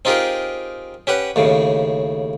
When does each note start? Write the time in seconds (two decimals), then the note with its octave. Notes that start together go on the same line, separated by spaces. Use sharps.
0.05 C4 D#4 F4 G4 G#4 A#4
1.07 C#4 G4 B4 F#5
1.36 D#2 A2 C#3